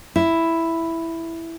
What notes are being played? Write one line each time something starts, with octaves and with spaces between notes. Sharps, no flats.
E4